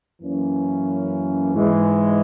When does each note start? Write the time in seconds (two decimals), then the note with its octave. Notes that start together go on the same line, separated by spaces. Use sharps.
0.20 F#2 E3 A#3 C#4
1.54 G#2 E3 G#3